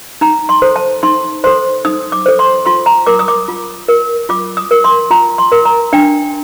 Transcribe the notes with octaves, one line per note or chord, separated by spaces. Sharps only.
D#4 A#5
C6
A4 C5
A5
D#4 C6
A4 C5 C6
D#4 D#6
D6
A4 C5
C6
F4 C6
A#5
A#4 D6
D#6
D6
F4
A#4
F4 D6
D#6
A#4
C6
F4 A#5
C6
A#4
A#5
D4 G5